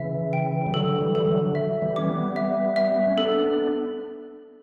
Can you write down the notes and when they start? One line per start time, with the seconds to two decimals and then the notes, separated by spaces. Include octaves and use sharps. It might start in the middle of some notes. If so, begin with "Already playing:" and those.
Already playing: C#3 E3 E5
0.33 G5
0.67 G3
0.74 D3 F#3 A4
1.01 E3 G3
1.15 A4
1.28 D3 F#3
1.55 E5
1.82 E3 G3
1.96 C#4 D6
2.09 G3 B3
2.36 E5
2.76 E5
2.96 B3
3.06 C#4
3.17 B3 D4 A4
3.44 B3 D4